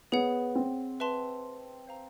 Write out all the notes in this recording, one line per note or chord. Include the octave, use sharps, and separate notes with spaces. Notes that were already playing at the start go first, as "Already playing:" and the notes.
B3 G#4 C#5 F#5
C4
B4 E5 A5 C6
C5 F5 A#5